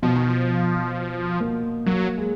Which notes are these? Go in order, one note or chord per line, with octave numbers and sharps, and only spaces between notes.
B2 F3
D#3
F3
A#3
F#3 A#3
G#3